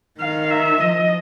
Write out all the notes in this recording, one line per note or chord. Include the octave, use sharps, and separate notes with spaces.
D#3 F5
E5
F3 D#5